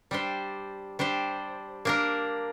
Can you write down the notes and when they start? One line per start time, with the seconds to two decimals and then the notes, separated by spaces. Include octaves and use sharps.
0.11 G3 D4 G4 C5
0.99 G3 D4 G4 C5
1.85 A#3 D4 A#4